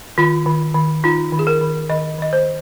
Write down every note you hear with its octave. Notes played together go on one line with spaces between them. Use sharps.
D#3 F4
D#3
D#3
D#4 F4
D#3
G#4
A#4
D#3
D#3 D#5
D#3 D#5
C5